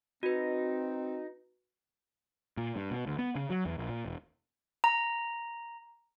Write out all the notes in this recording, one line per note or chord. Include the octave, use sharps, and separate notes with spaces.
C4 D#4 F#4 B4
A#2
G2
B2
D2
B3
C#3
F#3
E2
A#1
A#2
E1
A#5